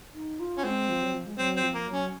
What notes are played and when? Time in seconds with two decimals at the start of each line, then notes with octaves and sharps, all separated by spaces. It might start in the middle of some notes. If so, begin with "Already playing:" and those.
0.14 D#4
0.40 F4
0.57 C#4
0.64 G#3 C4
0.89 F3
1.02 F#3
1.12 F3
1.26 G#3
1.38 F#3 C4
1.56 C4
1.62 F3
1.74 A#3
1.87 F#3
1.93 C#4